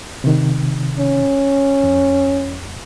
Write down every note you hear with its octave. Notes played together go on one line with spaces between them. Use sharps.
C3 D#3
C#4
F2